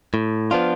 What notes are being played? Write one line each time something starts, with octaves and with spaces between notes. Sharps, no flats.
A2
F3 B3 D4 F4